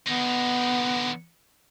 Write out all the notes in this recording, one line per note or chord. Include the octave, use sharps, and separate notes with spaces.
D3 B3 D#4